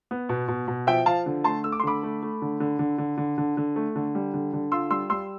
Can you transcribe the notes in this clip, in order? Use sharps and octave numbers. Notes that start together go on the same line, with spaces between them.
B3
B2
B2
B2
F3 E5 G5
F3 F5 A5
D3
A3 A5 C6
A3 E6
D6
C6
D3 B5 D6
A3
A3
D3
D3
D3
D3
D3
D3
D3
A3
D3
G3
D3
D3
F4 C6 E6
G3 C6 E6
G3 C6 E6